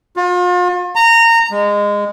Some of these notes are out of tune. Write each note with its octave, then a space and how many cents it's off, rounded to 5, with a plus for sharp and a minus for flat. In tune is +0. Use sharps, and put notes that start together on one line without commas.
F4 +40
A#5 -20
G#3 -20